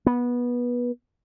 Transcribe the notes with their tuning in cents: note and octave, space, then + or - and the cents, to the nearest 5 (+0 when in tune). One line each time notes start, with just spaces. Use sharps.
B3 -20